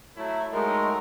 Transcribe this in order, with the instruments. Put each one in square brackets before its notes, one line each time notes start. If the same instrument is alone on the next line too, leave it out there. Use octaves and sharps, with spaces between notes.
[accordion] F#3 [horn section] A3 E4
[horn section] F#3 D#4 [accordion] G#3 A3 [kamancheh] A#4